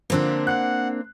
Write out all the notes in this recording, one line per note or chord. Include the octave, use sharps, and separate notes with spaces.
D3 F3 A#3 C4 D4
F#5 F#6